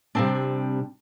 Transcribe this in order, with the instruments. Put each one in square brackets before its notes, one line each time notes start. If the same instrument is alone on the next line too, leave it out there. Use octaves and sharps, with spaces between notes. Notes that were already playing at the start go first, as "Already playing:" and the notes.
[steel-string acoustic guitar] C3 G3 A#3 C4 D4